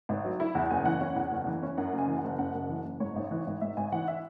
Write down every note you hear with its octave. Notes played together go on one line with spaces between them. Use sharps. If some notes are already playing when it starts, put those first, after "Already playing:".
G#1
F#3
E4
E2
F#1 G#5
E3 F#5
C#4 F#5
E2 F#5
F#1
E3
C#4
F#2 F#5
F#1
G#5
E3
F#5
F#1
F#2 F#5
F#1
E3
F#1
G#2 C#5
G#1
E3
G#1
G#2 E5
G#1 G#5
E3 F#5
E5